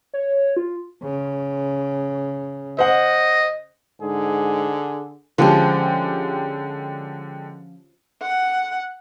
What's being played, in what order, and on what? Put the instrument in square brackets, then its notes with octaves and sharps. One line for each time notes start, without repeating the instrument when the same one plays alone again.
[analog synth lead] C#5
F4
[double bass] C#3
[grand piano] C5 F#5 [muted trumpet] D#5
[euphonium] G#2 [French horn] D3 [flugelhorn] G#4
[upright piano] D3 G#3 G4 [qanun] F3 C#4
[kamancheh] F#5